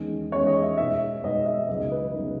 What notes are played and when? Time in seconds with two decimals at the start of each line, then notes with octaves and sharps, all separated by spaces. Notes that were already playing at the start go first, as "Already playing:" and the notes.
Already playing: E2 D#3 G#3 C#4
0.32 E2 D#3 G#3 C#4 C#5
0.47 D#5
0.62 E5
0.77 B2 G#3 B3 D#4 E5
1.23 B2 G#3 B3 D#4 D#5
1.46 E5
1.69 C#2 C#3 F#3 B3 D#4 D#5
1.92 B4
2.14 C#3 F#3 B3 D#4